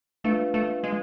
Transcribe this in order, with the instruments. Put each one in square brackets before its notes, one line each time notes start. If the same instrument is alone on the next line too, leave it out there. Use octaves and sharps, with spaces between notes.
[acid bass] A3 [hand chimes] D4 F4 B4 F5
[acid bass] A3
G#3